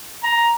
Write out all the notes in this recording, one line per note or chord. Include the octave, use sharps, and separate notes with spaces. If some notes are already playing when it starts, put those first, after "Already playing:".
A#5